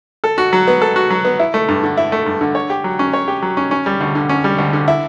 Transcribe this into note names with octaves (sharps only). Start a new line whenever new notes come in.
A4
F#4
F#3
B3
A4
F#4
F#3
B3
E4
A3
G2
D3
E4
A3
G2
D3
C#5
G4
F#3
C#4
C#5
G4
F#3
C#4
C#4
G3
D2
D3
C#4
G3
D2
D3
E4